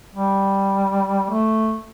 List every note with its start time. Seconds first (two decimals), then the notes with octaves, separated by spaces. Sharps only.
0.15 G3
1.31 A3